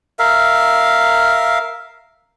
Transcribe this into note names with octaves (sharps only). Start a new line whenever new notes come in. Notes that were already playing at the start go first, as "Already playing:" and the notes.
A#4 E5 F5